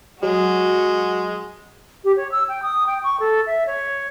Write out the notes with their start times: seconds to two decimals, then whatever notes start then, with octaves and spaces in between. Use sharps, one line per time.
0.23 F#3 G#3 F#4
2.04 G4
2.17 C#5
2.32 E6
2.49 G5
2.63 D#6
2.87 G5
3.04 C#6
3.20 A4
3.47 E5
3.67 C#5